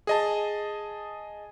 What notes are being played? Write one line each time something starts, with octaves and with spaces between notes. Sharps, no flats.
G#4 D#5 A5